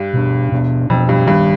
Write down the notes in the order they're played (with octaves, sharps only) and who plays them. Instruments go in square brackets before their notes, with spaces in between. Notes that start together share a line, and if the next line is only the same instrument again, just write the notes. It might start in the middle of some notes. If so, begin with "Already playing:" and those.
Already playing: [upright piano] G2
[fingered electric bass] B2 B3 D4
B2 B3 D4
[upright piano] F2 [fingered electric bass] B2 B3 D4
[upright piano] G2
[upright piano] G2 [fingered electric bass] D#3 G3 D4